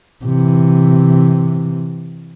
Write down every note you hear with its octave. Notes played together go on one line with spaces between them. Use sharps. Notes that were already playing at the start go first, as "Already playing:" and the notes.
C3 E3